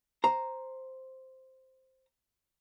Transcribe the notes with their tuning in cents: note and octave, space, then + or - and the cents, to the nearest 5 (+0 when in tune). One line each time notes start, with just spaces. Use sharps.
C5 +0 A#5 +0